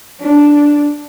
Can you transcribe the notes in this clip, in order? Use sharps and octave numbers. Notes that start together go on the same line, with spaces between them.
D4